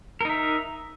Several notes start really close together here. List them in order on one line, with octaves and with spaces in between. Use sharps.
A#4 D#4 E5